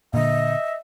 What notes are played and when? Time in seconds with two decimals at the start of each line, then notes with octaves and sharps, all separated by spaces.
0.14 A#2 D3 D#5 E5